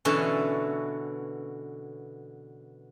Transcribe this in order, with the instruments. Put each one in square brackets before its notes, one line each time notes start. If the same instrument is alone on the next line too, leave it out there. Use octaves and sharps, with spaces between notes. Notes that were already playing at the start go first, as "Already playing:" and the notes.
[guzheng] B2 D3 E3 C#4 A5